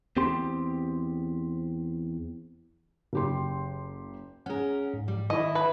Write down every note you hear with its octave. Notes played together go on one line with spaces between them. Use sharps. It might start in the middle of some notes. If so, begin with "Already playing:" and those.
E2 C4 G4 C6
F#1 G4 C6
C#4 G#4 A#4 F#5
G#2
G3
D#3 E4 D#5 B5
B4